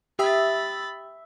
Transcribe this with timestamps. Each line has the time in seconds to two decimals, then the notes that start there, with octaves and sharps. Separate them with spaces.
0.19 G4 E5 G5 B5 D#6 A6